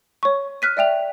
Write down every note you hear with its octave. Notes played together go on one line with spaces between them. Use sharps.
C#5 C#6
F6 F#6 B6 D#7
D5 E5 G5 F7